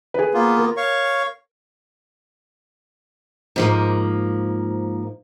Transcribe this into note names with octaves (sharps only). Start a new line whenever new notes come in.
G#4 B4
A#3 B3 F4
A#4
C#5 F5 C#6
G#2 F3 A#3